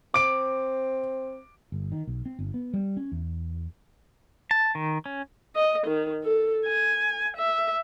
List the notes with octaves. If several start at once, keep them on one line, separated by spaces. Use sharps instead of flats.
C4 D6 D7
G1
D#3
B1
C4
G1
B3
G3
C#4
E2
A5
D#3
C#4
D#5
D#3
A4
G#5
E5